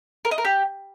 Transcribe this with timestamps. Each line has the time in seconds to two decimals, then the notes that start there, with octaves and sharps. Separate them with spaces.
0.25 A#4
0.31 D#5
0.38 A#4
0.45 G4